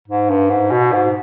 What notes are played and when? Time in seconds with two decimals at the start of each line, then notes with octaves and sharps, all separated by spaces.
0.08 G#2
0.29 G2
0.50 G#2
0.72 B2
0.93 G#2